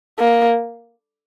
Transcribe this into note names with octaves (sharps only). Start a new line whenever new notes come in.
A#3